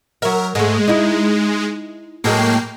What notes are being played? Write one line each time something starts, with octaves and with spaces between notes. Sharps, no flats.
F#3 A#4 E5
G#2 G#3 A3
D#4 E4
A2 F#3 G#3 A#3 G5 C7